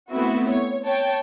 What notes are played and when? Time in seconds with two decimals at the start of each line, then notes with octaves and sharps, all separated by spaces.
0.10 A3 B3 C4 E4 F#4
0.48 C#5
0.85 C#5 G5 A5